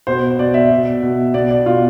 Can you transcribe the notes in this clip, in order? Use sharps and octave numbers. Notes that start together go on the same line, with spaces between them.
B2 C5
B2 D5
E5
B2
B2
B2 D5
D5
B2 F4